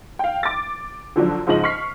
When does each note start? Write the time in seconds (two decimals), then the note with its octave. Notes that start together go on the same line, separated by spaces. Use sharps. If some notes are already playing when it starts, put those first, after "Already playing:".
0.19 F5 G5
0.43 D6 A6
1.16 D3 F3 F#3 D4
1.47 G#2 C#3 F3 C#4 D#5 F#7
1.64 C#6 F6 B6 C7